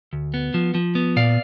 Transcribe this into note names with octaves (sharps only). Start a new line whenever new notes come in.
D2
B3
F3
F3
B3
A#2 D5 F5